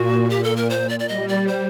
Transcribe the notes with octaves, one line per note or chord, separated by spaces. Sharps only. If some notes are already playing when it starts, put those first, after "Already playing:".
Already playing: A#2 F#4
A#2 G4
A4
A#4
C5
D5
D5
G3 D#5
D5
C5